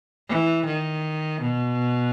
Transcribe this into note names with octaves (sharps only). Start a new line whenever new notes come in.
E3
D#3
B2